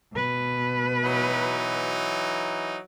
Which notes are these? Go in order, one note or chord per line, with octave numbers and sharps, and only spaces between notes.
B2 B4
E3 F#3 D#4